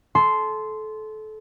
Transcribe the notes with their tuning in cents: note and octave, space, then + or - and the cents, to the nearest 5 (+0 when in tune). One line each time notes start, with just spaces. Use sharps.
A4 -25 C6 -5